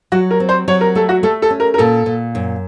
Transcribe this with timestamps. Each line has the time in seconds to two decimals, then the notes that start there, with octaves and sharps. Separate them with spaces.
0.12 F#3 F#4
0.31 A#4
0.40 C4
0.49 C5
0.68 F#3 C#5
0.81 A#4
0.95 A3 A4
1.09 F#4
1.23 A3 A4
1.42 A4
1.50 C#4
1.60 A#4
1.74 A#4
1.78 A#2 A4
2.06 A#2
2.35 F#2